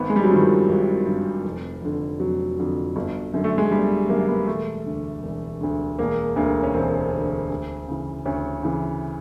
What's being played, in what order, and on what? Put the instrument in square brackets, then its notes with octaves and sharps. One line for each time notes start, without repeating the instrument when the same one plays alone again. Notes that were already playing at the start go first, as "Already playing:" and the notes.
Already playing: [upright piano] G#1 B3
G#3
G3
F#3
G2 D#3 F3
G#1
G2 D#3
F1
F2 D3
F1 F#3
F2 D3
G1
F#2 D3
A3
G#3
G1 G3
F#2 D3 A#3
B3
E1 A3
D2 D3
E1
D2 D3
E1 A#3
D2 D3 A#3
C#4
E1 C4
D2 D3
D2
C#3 E3
D2 C#4
C#3 E3